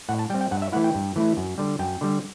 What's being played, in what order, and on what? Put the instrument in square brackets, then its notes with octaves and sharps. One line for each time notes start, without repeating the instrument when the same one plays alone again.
[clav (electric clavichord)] A2 F#5
A5
G3 G5
C4
G5
G2 F#5
E5
E3 A3 E4 F#5
G5
G2
E3 A3 E4
F#2
D3 G3
F#2 G5
D3 G3